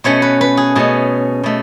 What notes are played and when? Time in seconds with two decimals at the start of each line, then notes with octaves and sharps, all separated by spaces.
0.04 B2 A3 C#4 C#5
0.22 B4
0.41 B4
0.57 G#4
0.75 B2 A3 C#4 G#4
1.43 B2 A3